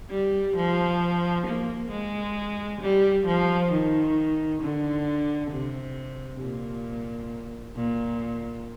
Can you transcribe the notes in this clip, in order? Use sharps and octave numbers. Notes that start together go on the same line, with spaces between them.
G3
F3
A#3
G#3
G3
F3
D#3
D3
C3
A#2
A#2